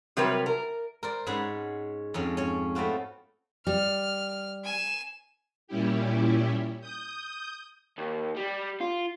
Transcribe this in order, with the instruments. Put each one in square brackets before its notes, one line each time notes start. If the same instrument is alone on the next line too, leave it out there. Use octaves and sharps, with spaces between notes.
[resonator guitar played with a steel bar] C3 F#3 G3 A#4 B4
A#4
[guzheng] A#4 C5 D5
G#2 G#3 C#4 G#4 F#5 B5
F2 G#2 C#4
C#4 C#5
A3 B3 C4 F4 F#4
[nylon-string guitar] G3 [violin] F6
[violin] G#5 E7
[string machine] A#2 G3 C#4 E4 G4
D#6 G6
[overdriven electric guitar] D#2
G3
F4